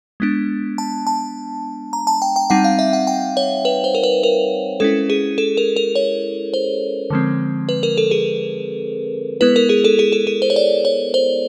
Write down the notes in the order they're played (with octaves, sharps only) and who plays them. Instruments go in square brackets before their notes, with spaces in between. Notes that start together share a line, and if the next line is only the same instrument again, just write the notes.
[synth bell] G#3 B3 D4
A5
A5
A#5
A5
G5
G5
G3 C4 D#4 F#5
F5
E5
F#5
G5
C#5
B4
C5
A#4
B4
A#4
G#3 C#4 E4 A4
G#4
A4
A#4
A#4
C#5
C5
D3 F3 G#3 C4
B4
A#4
A4
G#4
G#3 B3 E4 B4
A#4
G#4
A4
G#4
A4
G#4
C5
C#5
D5
C#5
C5